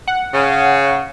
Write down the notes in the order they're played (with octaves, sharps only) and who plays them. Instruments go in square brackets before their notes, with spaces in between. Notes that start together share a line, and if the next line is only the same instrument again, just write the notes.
[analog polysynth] F#5
[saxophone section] C#3